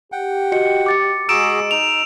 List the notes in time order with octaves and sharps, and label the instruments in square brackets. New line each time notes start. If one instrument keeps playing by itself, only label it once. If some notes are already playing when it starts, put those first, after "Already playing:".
[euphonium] G4 [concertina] F#5 G5
[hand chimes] F#4 D#5 C#7
D6 A6 C#7
[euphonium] G#3 [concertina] F#4 G#4 A#5 [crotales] E6 D7 E7
[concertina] D#4 [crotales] F7